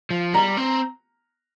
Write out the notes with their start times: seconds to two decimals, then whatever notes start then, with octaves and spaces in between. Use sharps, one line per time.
0.11 F3
0.33 G3 A#5
0.57 C4